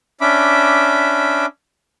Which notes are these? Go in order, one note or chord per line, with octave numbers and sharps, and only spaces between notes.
C#4 D4 E5 B5 D6